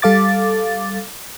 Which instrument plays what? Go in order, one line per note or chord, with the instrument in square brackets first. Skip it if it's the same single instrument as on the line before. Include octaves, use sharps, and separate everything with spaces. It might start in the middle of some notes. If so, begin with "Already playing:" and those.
[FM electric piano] G3 A4 F5 D6 A6